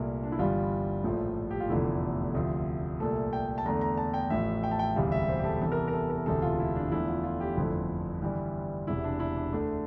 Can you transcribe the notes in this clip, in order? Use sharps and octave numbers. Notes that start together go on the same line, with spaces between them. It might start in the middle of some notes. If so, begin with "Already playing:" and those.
Already playing: C2 A#2 A3
D4
E4
G1 G2 E3 G3 F4
A#1 A2 F3 A3
G4
F4
F1 E2 D3 F3 A3 E4
D2 C3 F3
C2 A#2 A3 A4
G5
A5
E2 D3 A3 A#5
A#5
A5
G5
A1 A2 F3 E5
G5
A5
G5
E1 D2 C3 E3 G3 F5
E5
C5
G4
A4
E2 C3 E3 A4
A#4
A4
A#4
A4
A#4
E1 D2 C3 E3 A3 A4
F4
E4
D4
E2 D3 F3 A3 E4
F4
F4
G4
G1 F2 D3 F3 A3 E4
G1 G2 E3 G3
E1 E2 C3 E4
D4
E4
D4
D2 D3 A3 D4